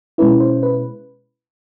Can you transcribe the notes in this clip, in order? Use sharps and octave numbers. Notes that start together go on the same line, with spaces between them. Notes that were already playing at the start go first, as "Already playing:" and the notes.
B2 G#3 C#4 E4 B4
C5
B4